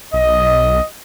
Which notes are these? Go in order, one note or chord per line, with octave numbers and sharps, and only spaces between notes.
B1 D#5